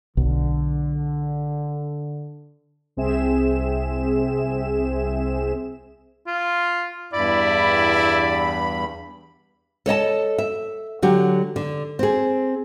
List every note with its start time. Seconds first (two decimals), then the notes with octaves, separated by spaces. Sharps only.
0.17 B1 D3
2.97 C2 C4 G#4 E5 E7
6.27 F4
7.13 E2 G2 E4 D5 B5
9.86 A4 C#5 D#5 A5
10.38 E5
11.02 D3 F#3 G4
11.56 D3
11.99 C4 G#4